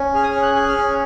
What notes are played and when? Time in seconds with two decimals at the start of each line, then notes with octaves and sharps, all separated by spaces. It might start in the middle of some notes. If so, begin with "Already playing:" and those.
Already playing: C#4
0.15 G#4 F6
0.24 D#6
0.31 C#4 F6
0.42 F#6
0.55 G#4
0.69 F6
0.77 C#4